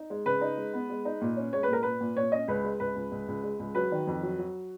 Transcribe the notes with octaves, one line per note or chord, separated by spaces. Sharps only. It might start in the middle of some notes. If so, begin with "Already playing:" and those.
Already playing: D#4
G#3
C#3 B4
D#4
G#3
B3
G#3
D#4
A#2
C#4
G#3 C#5
B4
A#2 A#4
A#2 B4
A#2
A#2 C#5
C#4 D#5
C#2 B4
G#3
C#2 B4
C#2
C#2
C#2
G#3
C#2
F#3 B4
D#3
F2
F#3
F#3